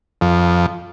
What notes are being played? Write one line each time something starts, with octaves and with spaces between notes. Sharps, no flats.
F2